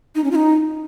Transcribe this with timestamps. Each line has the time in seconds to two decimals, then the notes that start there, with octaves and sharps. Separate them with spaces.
0.15 D#4
0.24 C#4
0.31 F4
0.35 D#4